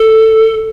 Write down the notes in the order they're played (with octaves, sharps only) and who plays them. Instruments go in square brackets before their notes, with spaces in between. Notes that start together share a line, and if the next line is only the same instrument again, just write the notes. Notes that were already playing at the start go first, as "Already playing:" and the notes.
Already playing: [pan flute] A4